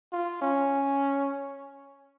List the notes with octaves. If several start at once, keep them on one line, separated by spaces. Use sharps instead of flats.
F4
C#4